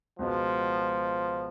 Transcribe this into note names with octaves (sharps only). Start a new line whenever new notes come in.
C#2 B2 F3 G#3 B3